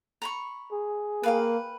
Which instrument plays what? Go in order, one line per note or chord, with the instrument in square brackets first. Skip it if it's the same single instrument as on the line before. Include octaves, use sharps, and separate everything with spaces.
[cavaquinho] A#5 B5 C#6
[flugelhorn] G#4
[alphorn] A#3 [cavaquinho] B4 F5 G5